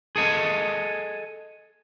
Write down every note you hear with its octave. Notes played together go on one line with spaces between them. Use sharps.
G#4 A4 D#5 G#5